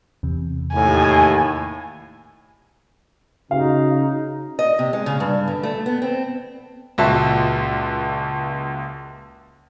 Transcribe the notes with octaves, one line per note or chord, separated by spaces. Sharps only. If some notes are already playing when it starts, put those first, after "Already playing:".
E2 C3
D#2 A2 G#5
C#3 D#4 F#4 F5
D#5
C3
G#3
C#3
G2
D3
A3
B3
C4
C#2 A#2 F#4 E5 A5